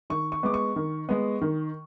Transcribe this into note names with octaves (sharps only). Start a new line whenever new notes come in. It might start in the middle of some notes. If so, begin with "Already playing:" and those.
D#3 C#6
C#6
G#3 B3 D6
C#6
D#3
G#3 B3
D#3